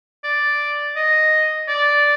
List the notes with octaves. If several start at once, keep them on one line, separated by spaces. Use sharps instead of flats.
D5
D#5
D5